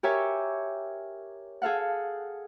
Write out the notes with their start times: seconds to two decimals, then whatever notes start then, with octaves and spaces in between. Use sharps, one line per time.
0.03 G4 A#4 C#5 E5 G5 G#5
1.62 G#4 A4 F5 F#5